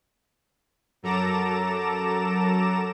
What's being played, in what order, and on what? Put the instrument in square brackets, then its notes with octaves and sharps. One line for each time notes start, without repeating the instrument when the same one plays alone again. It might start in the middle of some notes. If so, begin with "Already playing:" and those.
[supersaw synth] F#2 F#3 A4 A#5 D6 E7